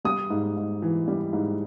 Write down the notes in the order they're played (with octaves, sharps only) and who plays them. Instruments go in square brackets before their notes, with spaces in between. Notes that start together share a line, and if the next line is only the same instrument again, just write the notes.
[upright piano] G3 D#6
G#2
G#2
E3
G3
G#2